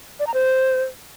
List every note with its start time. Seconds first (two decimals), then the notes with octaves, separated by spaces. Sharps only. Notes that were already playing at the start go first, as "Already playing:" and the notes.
0.20 D5
0.27 A#5
0.34 C5